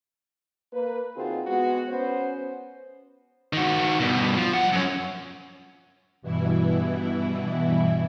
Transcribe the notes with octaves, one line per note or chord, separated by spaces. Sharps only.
A#3 B4
D3 C4 D#4 F4 F#4 G#4
G#3 B3 F#4
B3 C#4 C5
D#3 F#4
G2 B2
F3
G2 F#5
F#2 C#4
G2 B2 E3 E4